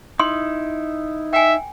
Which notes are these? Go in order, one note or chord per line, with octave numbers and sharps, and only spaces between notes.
D#4 E4 C6
E5 G5 G#5